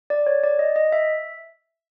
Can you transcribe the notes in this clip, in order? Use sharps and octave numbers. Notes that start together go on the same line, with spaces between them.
D5
C#5
D5
D#5
D#5
E5